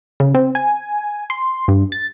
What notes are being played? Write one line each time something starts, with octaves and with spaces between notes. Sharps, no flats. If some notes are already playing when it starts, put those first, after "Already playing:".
C#3
C4
G#5
C6
G2
A6